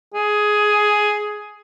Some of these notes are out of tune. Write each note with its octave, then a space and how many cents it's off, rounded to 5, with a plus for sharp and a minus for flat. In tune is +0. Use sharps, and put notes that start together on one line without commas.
G#4 +10